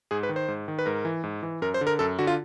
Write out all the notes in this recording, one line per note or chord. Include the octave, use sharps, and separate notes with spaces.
G#2 G#4
B4
D#3
C5
G#2
D#3
B4
G#2 A#4
E3
G#2
E3
F#2 A#4
C5
D3
A#4
F#2 A4
D3 F#4
F4